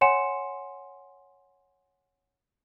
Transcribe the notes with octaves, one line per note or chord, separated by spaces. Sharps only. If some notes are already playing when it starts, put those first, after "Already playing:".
C#5 F#5 G#5 C6 C#7 E7